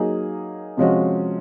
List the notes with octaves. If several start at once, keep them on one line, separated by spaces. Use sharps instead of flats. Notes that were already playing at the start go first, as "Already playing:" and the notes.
Already playing: F#3 A#3 D#4 G#4
C3 F3 G#3 C#4 F#4